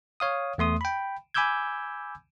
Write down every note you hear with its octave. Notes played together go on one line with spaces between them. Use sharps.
C#5 F5 D#6
E2 A3 C6 D#6
G5 B5
G#5 B5 D6 E6 G6 G#6